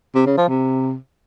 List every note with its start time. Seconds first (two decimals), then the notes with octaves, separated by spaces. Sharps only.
0.15 C3
0.26 C#3
0.37 F3
0.49 C3